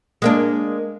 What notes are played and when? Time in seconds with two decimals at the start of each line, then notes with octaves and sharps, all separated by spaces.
0.22 G#3 A#3 D4